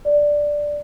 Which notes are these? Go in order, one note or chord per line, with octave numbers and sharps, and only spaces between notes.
D5